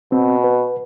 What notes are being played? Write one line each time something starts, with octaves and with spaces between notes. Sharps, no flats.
B2 C4
B4